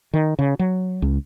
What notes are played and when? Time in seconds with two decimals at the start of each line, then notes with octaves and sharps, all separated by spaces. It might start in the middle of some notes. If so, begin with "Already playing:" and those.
0.13 D#3
0.39 C#3
0.59 F#3
1.02 C#2